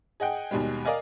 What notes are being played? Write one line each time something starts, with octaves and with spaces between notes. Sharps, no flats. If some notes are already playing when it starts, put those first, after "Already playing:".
G#4 D#5 F#5 G5
D#2 B2 G3 G#3
A#4 D5 D#5 F5 G#5